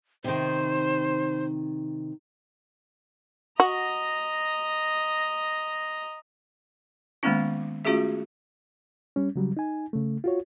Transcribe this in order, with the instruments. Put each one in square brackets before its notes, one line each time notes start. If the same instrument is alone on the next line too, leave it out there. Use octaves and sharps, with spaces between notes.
[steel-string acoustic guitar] C3 D#3 [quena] C5
[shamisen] F#4 [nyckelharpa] D#5 A#5
[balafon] D#3 G#3 A#3 B3 C#4 E4
A3 C#4 F4 F#4 G#4 E5
[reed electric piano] G3 C#4
C#3 F#3 G3
D#4 G#5
C#3 A3
F4 F#4 C#5